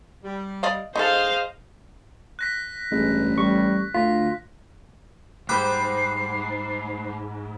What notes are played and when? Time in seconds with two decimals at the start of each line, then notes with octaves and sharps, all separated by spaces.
0.24 G3
0.63 D5 D#5 F5
0.96 D#4 G#4 A4 C5 D#5 F5
2.39 F#6 A#6 B6
2.92 A1 G2 G#3
3.38 G3 C#6
3.94 D2 D3 F4 B6
5.49 G#2 G3 C5 B5 D6 F#6 C7